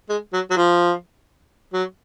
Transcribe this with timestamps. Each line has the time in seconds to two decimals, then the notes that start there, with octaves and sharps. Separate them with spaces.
0.09 G#3
0.33 F#3
0.50 F#3
0.57 F3
1.73 F#3